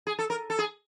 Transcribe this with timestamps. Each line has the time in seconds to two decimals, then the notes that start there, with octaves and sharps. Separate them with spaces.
0.07 G#4
0.19 A4
0.30 A#4
0.50 A4
0.59 G#4